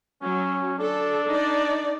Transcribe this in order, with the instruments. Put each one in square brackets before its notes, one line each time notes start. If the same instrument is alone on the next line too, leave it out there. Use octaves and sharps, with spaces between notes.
[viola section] F#3 [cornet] C#4
[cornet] D4 [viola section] A4
[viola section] D#4 D5